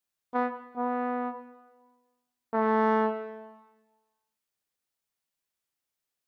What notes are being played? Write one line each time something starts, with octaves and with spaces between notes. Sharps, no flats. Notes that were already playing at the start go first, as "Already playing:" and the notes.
B3
B3
A3